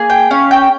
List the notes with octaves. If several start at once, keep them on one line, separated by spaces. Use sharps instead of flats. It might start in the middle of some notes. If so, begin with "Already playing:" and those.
Already playing: A#3 G#4
G5
C#4 F5
G5